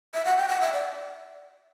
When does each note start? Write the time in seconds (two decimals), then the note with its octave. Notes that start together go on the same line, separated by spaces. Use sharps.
0.14 E5
0.25 F#5
0.37 G5
0.48 F#5
0.61 E5
0.73 D5